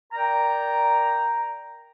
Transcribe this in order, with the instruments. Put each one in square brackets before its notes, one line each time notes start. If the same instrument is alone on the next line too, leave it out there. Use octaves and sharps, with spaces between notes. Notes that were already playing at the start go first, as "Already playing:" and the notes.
[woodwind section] A#4 D5 G5 A#5